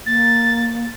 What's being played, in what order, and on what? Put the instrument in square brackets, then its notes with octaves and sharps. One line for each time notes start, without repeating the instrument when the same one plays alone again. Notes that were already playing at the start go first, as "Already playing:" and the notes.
[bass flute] A#3 [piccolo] A6